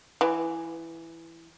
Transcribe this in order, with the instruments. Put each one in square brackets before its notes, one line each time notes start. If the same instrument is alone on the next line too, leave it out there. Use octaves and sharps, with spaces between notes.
[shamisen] E3